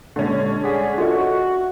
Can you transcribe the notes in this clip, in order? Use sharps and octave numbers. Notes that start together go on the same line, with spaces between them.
A#2 D3 G3 G#3 C#4
G#4 D5 F#5 B6
F4 F#4 A4 D#5 E5 C#6